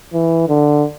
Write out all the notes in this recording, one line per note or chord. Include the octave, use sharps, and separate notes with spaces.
E3
D3